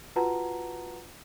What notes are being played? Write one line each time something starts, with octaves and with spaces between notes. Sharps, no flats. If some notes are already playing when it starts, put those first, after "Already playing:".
F4 F#4 B4 F#5 A5 A#5